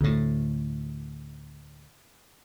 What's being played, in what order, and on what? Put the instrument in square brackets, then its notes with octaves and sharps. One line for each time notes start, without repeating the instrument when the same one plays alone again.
[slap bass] D2 A2